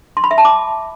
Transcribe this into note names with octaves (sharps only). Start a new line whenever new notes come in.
C6
B5
E5
A5
D6